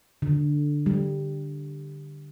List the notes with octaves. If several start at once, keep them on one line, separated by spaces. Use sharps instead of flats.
D3
G3